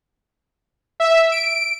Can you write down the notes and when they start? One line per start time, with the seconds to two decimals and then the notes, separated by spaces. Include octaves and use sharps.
1.00 E5
1.31 D7